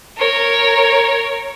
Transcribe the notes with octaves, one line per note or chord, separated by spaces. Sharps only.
A#4 C#5